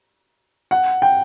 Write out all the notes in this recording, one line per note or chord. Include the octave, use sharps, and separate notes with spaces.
F#5
G5